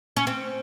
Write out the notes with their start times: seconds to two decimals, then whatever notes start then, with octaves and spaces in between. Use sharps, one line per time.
0.17 C#4
0.27 C4